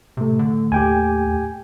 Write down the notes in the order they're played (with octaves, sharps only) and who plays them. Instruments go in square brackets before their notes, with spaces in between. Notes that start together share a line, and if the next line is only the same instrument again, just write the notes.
[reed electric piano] A2 A3 [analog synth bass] C3
[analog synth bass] D3
[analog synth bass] D#2 [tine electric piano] G4 G5 G#5